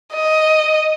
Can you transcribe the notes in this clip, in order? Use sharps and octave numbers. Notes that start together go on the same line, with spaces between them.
D#5